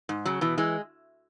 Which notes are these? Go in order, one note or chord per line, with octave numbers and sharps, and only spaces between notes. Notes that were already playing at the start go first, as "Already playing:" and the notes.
G#2
C#3 F#3
B2 E3
E3 G#3